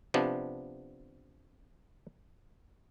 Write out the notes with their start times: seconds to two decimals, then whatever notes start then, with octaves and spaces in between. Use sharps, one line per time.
0.14 C3 F3 B3 D4